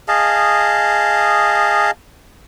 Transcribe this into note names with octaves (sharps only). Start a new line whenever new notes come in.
G#4 D#5 F5 A5